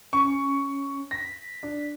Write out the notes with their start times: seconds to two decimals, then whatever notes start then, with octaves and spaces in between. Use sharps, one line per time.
0.13 C#4 C#6
1.11 A#6 B6
1.63 D4